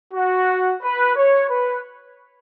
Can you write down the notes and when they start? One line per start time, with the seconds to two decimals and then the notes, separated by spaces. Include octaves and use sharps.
0.14 F#4
0.83 B4
1.16 C#5
1.50 B4